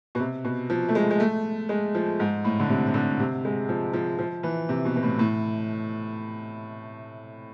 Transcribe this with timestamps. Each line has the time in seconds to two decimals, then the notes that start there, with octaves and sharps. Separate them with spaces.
0.15 B2
0.20 C3
0.44 B2
0.70 F3
0.89 A3
0.95 G#3
1.11 G#3
1.20 A3
1.69 G#3
1.95 F3
2.20 G#2
2.44 A2
2.60 D3
2.69 C3
2.87 C3
2.94 D3
3.19 C3
3.45 G#3
3.69 F3
3.93 F3
4.19 F3
4.43 E3
4.69 C3
4.85 B2
4.96 B2
5.03 A2
5.19 A2